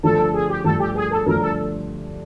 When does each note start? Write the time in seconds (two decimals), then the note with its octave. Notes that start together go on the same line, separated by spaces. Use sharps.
0.03 G2 D3 F3 A3 D4 A4
0.19 A4
0.34 G#4
0.49 G4
0.64 G2 D3 F3 A3 D4 A4
0.80 G4
0.95 G#4
1.11 A4
1.26 G2 D3 F3 A3 D4 A#4
1.41 A4